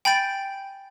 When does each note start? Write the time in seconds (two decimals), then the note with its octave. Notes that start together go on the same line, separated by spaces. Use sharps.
0.05 G5 G#5 B5 G6 A6 D7